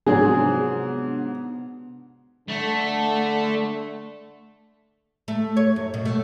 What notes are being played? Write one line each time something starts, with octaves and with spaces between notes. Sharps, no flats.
G#2 C3 F3 F#3 B3 D4 G#4
D3 A3
A3
C#5
F#2
B2
A3